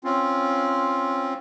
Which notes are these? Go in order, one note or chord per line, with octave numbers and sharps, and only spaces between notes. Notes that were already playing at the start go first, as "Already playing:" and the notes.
C4 C#4 F4